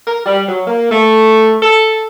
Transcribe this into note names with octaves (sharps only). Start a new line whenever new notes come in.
A#4
G3
F#3
A#3
A3
A4